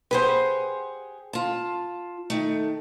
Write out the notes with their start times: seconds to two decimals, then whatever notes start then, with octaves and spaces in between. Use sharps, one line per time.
0.11 G4 G#4 B4 C5 F#5
1.33 F4 A5
2.30 D#3 A3